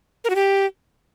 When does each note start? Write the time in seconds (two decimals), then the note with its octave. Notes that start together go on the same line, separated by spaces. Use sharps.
0.24 A#4
0.30 F#4
0.36 G4